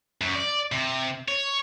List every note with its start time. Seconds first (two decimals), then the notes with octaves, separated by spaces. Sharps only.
0.21 F#2
0.35 D5
0.72 C3
1.28 C#5